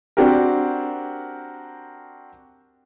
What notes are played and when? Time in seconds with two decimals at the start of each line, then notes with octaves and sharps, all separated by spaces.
0.17 C4 D4 F#4 G4 A#4